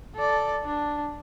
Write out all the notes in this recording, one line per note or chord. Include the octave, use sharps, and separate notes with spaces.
A4 D5
D4